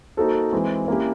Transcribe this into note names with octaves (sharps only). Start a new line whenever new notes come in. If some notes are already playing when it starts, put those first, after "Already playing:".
A#3 D#4 F#4 A4 C5
E3 G#3 C4
A#3 C#4 E4 G4